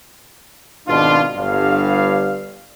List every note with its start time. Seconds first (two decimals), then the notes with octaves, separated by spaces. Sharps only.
0.88 G#1 B2 D4 F4
1.37 G1 G2 F5